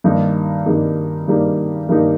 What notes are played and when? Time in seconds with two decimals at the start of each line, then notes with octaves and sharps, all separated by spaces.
0.04 G2 D#3 G3 A#3 D#4
0.66 G2 D#3 G3 A#3 D#4
1.28 G2 D#3 G3 A#3 D#4
1.89 G2 D#3 G3 A#3 D#4